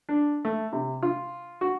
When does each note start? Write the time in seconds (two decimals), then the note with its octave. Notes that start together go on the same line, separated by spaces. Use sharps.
0.09 D4
0.45 A3
0.72 C3
1.03 F4
1.61 F#4